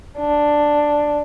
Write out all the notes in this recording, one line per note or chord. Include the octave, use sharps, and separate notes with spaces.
D4